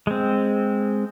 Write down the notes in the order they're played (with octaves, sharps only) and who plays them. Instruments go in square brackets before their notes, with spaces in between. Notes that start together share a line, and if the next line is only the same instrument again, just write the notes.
[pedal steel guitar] G#3 C4